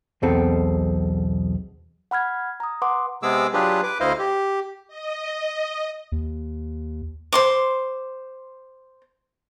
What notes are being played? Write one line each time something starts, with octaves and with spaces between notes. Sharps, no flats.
B1 E2 B2 C4 A4
F#5 B5 F6 G#6
A#5 D#6
B4 F#5 C6 D6 D#6
C3 G#3 B3 G#4 D6 E6
F#3 D4 F4 G4 G#4 B4
B4 D6
D2 E4 C5 D#5 F5
G4
D#5
D#2
C5 C6 D6